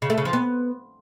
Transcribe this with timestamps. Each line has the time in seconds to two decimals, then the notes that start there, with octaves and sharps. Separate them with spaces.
0.02 C#3
0.10 A3
0.18 C#3
0.25 F3
0.33 B3